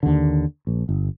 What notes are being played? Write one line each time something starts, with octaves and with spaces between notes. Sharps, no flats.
D#2 D3
A#1
G1